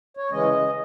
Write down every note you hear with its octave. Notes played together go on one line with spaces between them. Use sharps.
C#5
C#3 E3 G#3 C#4 D#5